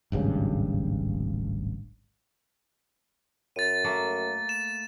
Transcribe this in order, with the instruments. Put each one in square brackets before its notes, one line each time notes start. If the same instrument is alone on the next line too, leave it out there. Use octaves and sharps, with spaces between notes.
[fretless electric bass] D1 G#1 G2 C#3
[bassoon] F#2 [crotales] A6 D#7
[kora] A3 A#3
[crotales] E7